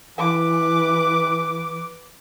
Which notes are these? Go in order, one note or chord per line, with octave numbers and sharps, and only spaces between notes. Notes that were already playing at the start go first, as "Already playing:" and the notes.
E3 B4 D6